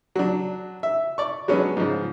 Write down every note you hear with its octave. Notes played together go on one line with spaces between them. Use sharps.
F#3 D4
E5
D5 C#6
F#3 G#3 B3 C#4 D4
G#2 C#3 F3